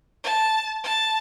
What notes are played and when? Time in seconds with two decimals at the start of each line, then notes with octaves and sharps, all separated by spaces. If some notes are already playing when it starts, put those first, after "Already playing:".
0.23 A5
0.84 A5